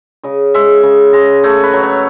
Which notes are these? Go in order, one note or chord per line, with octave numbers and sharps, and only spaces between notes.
C#3 D#5
G#3 E5
C#3
G#3 D#5
A3 C#5
B4
F#3
C#5